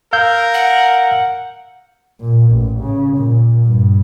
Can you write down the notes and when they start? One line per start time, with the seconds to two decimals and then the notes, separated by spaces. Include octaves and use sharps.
0.13 A#4 F5 E6 G6
0.54 F#5
2.20 A#2
2.51 A1
2.80 C#3
3.17 A#2
3.65 G2